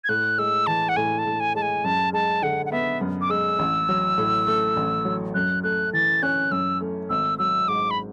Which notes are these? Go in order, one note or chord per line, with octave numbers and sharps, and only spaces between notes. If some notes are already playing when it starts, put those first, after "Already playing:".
G#6
A2 F#6
G#3 E6
E3 A5
F#5
A2 G#5
A5
A2
G#5
G#3 A5
G#5
F#2 A5
G#3 A5
D3 F#5
F#5
B3 E5
F#2
D6
G#3 E6
A1
F#3
A2
A3
A1
F#3
F#2 F#6
A3 F#6
E3 A6
C#4 F#6
F#2 E6
A3
G#1 E6
F#3 E6
G#2 D6
B5